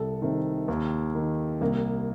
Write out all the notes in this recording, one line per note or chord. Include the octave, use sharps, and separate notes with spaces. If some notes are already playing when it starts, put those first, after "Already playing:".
Already playing: C2 A4
C3 D#3
D#2
D#3
C2 A#3